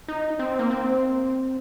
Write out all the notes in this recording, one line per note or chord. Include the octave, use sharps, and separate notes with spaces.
D#4
C4
A#3
C4